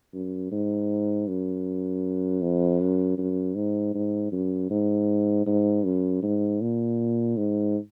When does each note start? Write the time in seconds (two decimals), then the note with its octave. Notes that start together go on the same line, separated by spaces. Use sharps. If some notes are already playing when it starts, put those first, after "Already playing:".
0.13 F#2
0.52 G#2
1.28 F#2
2.42 F2
2.80 F#2
3.18 F#2
3.56 G#2
3.94 G#2
4.32 F#2
4.70 G#2
5.46 G#2
5.85 F#2
6.23 G#2
6.61 A#2
7.37 G#2